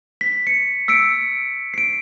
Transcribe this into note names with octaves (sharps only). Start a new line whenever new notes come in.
B6
C#7
E6 B6 C#7 D7
C7 D7